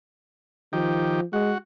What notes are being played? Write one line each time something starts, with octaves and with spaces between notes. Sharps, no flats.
D#3 F3 G4
G#3 F#4